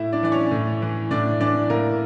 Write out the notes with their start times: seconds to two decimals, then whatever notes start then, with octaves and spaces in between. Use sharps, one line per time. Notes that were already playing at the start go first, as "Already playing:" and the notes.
Already playing: A2 E4 E5
0.12 D4 D5
0.23 E3 D5
0.32 C#4 C#5
0.51 A2
0.82 E3
1.11 A2 D4 D5
1.40 E3 D4 D5
1.69 A2 A#3 A#4